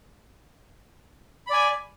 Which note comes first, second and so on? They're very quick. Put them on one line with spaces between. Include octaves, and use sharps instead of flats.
B5 D5 G#5